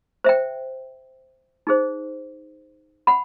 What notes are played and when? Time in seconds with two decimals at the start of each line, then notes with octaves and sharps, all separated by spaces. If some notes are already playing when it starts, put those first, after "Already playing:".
0.24 C5 E5 G5
1.67 D#4 G#4 C5
3.07 F#5 B5